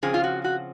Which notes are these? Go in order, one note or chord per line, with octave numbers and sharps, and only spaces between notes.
C#3 F3 C4 G#4
F4
F#4
F#4